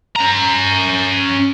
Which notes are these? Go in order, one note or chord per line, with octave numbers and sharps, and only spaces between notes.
C#4 A#5